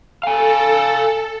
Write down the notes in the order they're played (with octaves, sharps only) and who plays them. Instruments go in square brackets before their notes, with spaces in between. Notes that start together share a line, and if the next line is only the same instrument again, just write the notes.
[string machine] A4 [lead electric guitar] F5 G#5